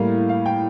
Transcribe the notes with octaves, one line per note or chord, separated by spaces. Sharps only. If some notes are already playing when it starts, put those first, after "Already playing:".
Already playing: A2 G3 A#3 F5
F5
G5